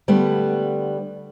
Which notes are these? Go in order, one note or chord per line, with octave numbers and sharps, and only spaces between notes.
D3 G3 A3 B3